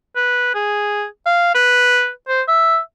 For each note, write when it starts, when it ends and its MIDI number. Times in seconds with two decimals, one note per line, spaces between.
0.16 0.53 71
0.55 1.05 68
1.26 1.50 77
1.55 2.10 71
2.28 2.42 72
2.48 2.78 76